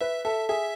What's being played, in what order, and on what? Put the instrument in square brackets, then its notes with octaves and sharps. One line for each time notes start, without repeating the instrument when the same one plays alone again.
[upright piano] B4 [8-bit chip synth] E5
[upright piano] A4 [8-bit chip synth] E5
[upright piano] G#4 [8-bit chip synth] E5